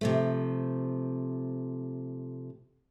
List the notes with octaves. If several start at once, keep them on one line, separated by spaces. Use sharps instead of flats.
C3 F3 A3